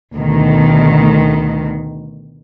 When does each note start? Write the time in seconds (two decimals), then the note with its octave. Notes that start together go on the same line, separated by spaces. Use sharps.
0.15 D2 B2 D#3